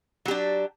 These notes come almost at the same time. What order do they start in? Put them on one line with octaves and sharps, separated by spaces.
F#3 G4 D4